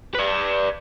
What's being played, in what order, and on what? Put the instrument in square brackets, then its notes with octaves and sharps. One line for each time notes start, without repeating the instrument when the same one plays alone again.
[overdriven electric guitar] B4 D5